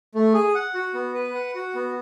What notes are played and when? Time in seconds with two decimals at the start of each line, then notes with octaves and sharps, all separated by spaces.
0.15 A3
0.34 G#4
0.55 F#5
0.75 F#4
0.94 B3
1.14 B4
1.35 F#5
1.55 F#4
1.75 B3